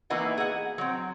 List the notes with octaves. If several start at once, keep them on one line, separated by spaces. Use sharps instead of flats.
E3 A#3 B3 D#4 E4 F#4
G#4 F#5
F#3 C4